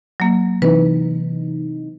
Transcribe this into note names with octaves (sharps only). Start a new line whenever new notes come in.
F#3 A#3
C3 E3 D#4 B4